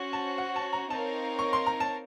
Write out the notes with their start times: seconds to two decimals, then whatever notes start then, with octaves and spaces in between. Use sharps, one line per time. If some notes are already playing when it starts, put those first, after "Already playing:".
Already playing: C#4 F#4 C5
0.13 A5
0.38 F#5
0.56 A5
0.73 A#5
0.90 C4 D#4 A#4 C#5 F5 A5
1.39 C#6
1.53 C6
1.66 A#5
1.80 A5